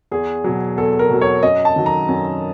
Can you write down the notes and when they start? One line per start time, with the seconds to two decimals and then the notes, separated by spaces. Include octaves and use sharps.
0.11 E2 G#4
0.44 B2 F#3
0.77 E2 A4
0.99 A#4
1.10 B2 F#3
1.21 C#5
1.42 F#2 D#5
1.65 A5
1.76 D#3 F#3
1.86 A#5
2.09 F#2